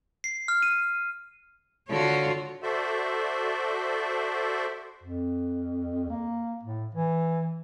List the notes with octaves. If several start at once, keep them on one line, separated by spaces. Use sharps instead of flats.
C7
F6
D#7
D3 F4 F#4 C#5
F#4 A4 C5 D5 E5
F2
A#3
A2
E3